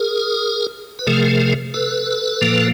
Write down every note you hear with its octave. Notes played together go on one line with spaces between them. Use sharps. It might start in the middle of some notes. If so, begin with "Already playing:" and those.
Already playing: G#4 A#4
B4
C3 F3 A3 G#4 A#4
A4 B4
A#2 F3 A#3